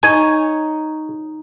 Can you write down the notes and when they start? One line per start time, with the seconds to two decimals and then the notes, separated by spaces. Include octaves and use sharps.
0.03 D#4 C#5 D#5 G#5